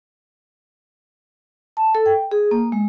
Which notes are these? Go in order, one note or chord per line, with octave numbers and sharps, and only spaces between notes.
A5
A4
G5
G#4
A#3
G#3